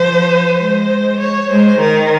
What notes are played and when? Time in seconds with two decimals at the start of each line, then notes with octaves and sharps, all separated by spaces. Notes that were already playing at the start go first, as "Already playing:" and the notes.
Already playing: F3 C5
0.60 G#3 C5
1.21 C#5
1.50 G#3 C5
1.80 D#3 A#4